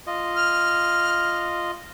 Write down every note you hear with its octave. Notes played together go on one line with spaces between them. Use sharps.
F4 D#5
F6